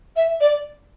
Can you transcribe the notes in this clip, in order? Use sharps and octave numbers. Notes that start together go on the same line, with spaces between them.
E5
D5